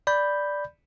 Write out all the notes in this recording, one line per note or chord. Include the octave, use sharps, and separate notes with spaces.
D5 B5 G6